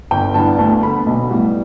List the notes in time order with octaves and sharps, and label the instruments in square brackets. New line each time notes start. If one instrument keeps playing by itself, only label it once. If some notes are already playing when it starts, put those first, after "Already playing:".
[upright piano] G1 G5
G2 E3 B3 A5
D2 A5
D3 B3 B5
B1
A2 G3 B3